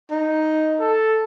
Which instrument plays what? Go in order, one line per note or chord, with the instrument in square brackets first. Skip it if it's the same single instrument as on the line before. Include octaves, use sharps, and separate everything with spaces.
[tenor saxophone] D#4
[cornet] A4